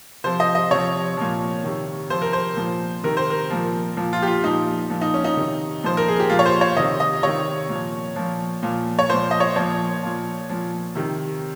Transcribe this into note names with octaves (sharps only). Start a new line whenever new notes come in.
C3 F3 C5
D#5
D#5
C3 F3 C#5
A#2 F3
C3 D#3
C3 F3 C5
A#4
C5
A#2 F3
C3 D#3 A#4
C5
A#4
A#2 F3
A#2 F3
F4
G4
F4
A#2 F3 D#4
A#2 F3
D#4
C#4
D#4
C3 D#3
A#2 F3 C5
A#4
G#4
G4
A#2 F3 F4
C#5
C5
C#5
C3 D#3 D#5
D#5
C3 D#3 C#5
A#2
F3
A#2 F3
A#2 F3
C#5
A#2 F3 C5
D#5
C#5
A#2 F3 C#5
A#2 F3
A#2 F3
C3 D#3